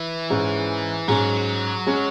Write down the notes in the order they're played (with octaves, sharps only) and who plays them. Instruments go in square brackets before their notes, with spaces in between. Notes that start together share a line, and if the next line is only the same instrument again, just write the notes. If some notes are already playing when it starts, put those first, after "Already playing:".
Already playing: [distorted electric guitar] E3
[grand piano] G#2 G#3 C#4
[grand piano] G#2 G#3 C#4 [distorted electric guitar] F#3
[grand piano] G#3 C#4